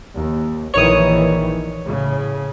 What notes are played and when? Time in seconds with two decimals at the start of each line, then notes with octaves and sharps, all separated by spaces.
0.15 D#2
0.74 A#1 D#3 E3 C#5 D#6
1.87 A2 C#3